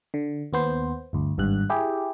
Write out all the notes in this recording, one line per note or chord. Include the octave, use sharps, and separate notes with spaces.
D3
D#2 B3 C5
G1 D2
G#1 G2 F#6
E4 G4 G#4